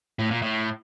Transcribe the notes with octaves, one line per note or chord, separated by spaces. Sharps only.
A2
A#2
A2